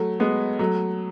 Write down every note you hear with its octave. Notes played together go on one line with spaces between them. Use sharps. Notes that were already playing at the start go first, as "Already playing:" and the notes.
Already playing: F#3 A3
G#3 B3
F#3 A3